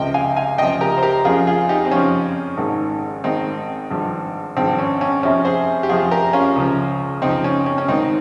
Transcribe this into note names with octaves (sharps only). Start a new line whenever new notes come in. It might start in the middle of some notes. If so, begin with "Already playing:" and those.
Already playing: C#2 C3 F3 D#5 G5
F5 G#5
F5 G#5
C#2 C3 F3 D#5 G5
G4 A#4
C5
G4 A#4
F2 C#3 F3 F4 G#4
F4 G#4
D#4 G4
C4
F2 C#3 F3 C#4
G#1 G#2 D#3
G#1 G#2 D#3 C4 D#4
G#1 G2 F3
G#1 G2 F3 C4
C#4
C#4
F2 C3 F3 C#4
G#4 C5
G4
F2 C3 F3 F4 G#4
G4 A#4
C#4 F4
C#2 C#3 F3
C#2 C#3 F3 C4 D#4
C#4
C#4
C#4
G#1 G#2 D#3 C4 D#4